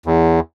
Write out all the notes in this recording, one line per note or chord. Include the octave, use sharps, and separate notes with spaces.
E2